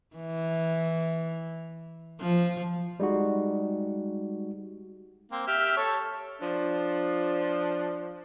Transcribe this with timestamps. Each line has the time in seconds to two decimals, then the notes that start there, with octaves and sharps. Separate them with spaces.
0.16 E3
2.21 F3
3.00 G3 G#3 D#4 F#4
5.32 A#3 C4
5.47 G4 E5 F6
5.77 A4 C#5
6.40 F3 D4